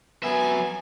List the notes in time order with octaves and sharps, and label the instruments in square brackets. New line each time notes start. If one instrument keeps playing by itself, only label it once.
[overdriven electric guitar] F#3 E5 [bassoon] B3 [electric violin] G#5